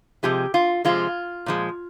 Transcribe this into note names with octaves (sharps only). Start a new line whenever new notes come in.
C3 F3 G#3 G4
F4
C3 F3 G#3 F4
A#2 F3 G#3